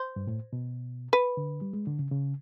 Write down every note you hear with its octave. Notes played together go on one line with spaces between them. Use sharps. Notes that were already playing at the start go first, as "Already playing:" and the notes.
Already playing: C5
G2
A2
B2
B4
D3
G3
G#3
D3
C#3
C#3